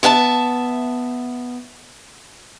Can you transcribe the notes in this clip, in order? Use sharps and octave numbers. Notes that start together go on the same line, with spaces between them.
B3 E5 F5 A5